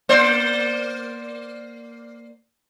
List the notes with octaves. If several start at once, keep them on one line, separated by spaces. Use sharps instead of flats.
A#3 C5 D5